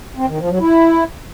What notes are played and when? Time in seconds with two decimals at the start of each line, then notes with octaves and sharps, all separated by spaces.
0.17 C4
0.28 D#3
0.39 F3
0.50 F#3
0.60 E4